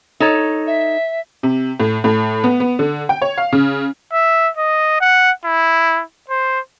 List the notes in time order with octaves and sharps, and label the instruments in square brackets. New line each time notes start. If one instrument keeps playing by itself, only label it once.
[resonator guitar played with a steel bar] D#4 A4 C#5
[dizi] E5
[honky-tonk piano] C3
A2
A2
B3
B3
D3
G5
C#5
F5
C#3
[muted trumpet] E5
D#5
F#5
E4
C5